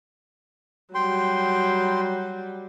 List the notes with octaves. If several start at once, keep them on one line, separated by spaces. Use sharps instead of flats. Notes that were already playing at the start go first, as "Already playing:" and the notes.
F#3 G3 G5 C6